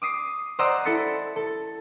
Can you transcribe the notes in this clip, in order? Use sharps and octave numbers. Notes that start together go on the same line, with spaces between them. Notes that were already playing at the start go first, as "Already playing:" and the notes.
D6 D#6 C7
C5 D5 D#5 F#5 A#5 E6
E4 A4 B5 A6 C#7
A4